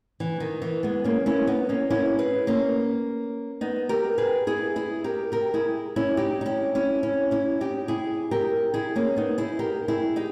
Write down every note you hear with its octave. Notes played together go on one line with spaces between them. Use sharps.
E3
D#3
E3
G#3 B3
A#3 C#4
C#4 E4
B3 D#4
A#3 C#4
C#4 E4
G#4 B4
A#3 C#4
B3 D#4
G4 A#4
G#4 B4
E4 G#4
E4 G#4
G4 A#4
G4 A#4
E4 G#4
C#4 E4
D#4 G4
D#4
C#4 E4
C#4 E4
C#4 E4
C#4 E4
D#4 G4
E4 G#4
G4 A#4
E4 G#4
A#3 C#4
B3 D#4
E4 G#4
G4 A#4
E4 G#4
D#4 G4